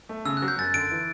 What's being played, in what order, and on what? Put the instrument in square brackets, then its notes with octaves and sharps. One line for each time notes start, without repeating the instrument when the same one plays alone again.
[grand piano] A3
[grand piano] C#3 [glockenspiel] E6
[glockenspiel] F#6
[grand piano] F#3
[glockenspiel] G6
[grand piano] F#2 [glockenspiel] A6
[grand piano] D3 [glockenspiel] D7
[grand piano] E3